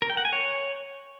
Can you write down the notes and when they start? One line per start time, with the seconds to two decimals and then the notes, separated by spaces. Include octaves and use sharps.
0.02 A#4
0.10 G5
0.17 F#5
0.25 G#5
0.33 C#5